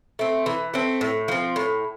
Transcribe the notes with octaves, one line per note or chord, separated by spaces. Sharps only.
A3 C4
E3
A3 C4
A2
F3 C4
A2